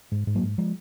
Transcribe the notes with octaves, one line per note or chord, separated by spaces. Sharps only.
G#2
G#2
F#3 A#3
G#2
F3 G#3